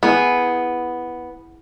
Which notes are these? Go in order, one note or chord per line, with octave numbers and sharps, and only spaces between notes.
B3 E4 G#4 E5